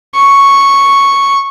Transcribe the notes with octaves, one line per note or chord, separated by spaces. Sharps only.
C#6